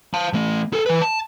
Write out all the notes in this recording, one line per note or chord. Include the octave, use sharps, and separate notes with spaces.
F5 A5
E3 A3
G#4 A4
E3 B4
A5